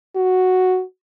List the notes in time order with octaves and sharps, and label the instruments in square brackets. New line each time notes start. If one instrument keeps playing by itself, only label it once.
[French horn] F#4